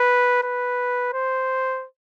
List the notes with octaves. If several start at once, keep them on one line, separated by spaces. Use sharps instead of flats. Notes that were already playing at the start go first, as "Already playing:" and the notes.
Already playing: B4
B4
C5